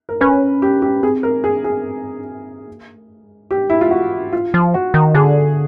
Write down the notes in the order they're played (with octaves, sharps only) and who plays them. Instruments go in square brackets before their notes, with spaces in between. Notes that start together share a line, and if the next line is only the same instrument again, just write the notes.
[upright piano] A#4
[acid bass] C#4 [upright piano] B4
[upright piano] G4
G4
[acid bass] C4 [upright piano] G#4
[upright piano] A#4
G#4
G#4
[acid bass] A#3
A3
G#3
[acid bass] G3 [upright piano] G4
[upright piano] E4
F4
F#4
[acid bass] F#3 [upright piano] F4
[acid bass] F3
[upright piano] F#4
[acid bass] D#3
[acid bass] D3 [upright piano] G#4